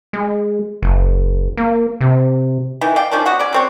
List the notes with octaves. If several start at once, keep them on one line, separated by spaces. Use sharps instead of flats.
G#3
F#1
A#3
C3
D#3 E3
D5 F5 G5
D#3 F3 C#4 D4
B3 F#4 F#5
C#4 D5
F#3 C4 C#5